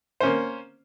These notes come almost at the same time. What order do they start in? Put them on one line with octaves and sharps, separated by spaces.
C5 C#4 A#3